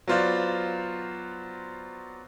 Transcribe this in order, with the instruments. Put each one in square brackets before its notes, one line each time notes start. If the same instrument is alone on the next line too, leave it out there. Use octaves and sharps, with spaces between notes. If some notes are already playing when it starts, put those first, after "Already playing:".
[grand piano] F#3 B3 F4 C5 D5 F5